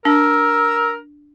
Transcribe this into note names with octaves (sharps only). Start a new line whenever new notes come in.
D4 A#4 E6